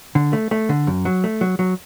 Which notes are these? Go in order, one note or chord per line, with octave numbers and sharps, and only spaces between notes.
D3
A3
A3
D3
F#2
F#3
A3
F#3
F#3